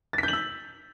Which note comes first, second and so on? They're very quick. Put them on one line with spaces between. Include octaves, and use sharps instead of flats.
A6 B6 G6 F#7 E6